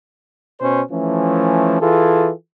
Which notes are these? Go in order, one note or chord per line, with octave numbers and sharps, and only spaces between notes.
B2 C#4 C5
E3 F3 A3 C#4
E3 F4 G#4 A4